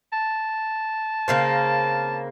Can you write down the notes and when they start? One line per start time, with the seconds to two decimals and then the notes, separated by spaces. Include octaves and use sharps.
0.13 A5
1.28 C#3 A#3 C4